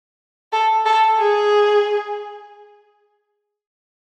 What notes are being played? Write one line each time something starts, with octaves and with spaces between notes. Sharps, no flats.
A4
A4
G#4